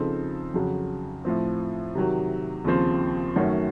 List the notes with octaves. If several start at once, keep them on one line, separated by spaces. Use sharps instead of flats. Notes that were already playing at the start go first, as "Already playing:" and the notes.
Already playing: C#3 F3 C4 D#4 A4
F2 C#3 F#3
A2 F3 C4
C3 D#3 F#3
D#2 C#3 F3 C4
F#2 D#3 A3 C#4 F#4